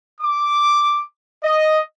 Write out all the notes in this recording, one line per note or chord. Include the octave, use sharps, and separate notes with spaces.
D6
D#5